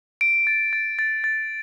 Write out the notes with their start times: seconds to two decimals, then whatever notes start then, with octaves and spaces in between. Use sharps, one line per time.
0.21 D7
0.47 A6
0.73 A6
0.99 A6
1.24 A6